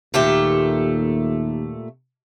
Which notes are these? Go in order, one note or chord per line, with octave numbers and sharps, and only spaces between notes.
D#2 A#2 A3 G4